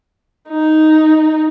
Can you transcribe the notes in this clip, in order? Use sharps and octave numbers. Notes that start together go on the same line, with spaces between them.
D#4